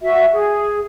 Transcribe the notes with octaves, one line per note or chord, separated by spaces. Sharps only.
F#4 E5
G#4